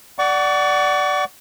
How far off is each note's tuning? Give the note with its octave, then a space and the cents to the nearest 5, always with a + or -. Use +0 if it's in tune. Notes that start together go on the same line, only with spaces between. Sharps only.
D5 +0 F#5 +15 C#6 +40